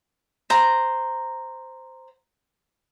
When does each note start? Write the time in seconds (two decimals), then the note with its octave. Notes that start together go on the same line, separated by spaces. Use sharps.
0.50 C5 A#5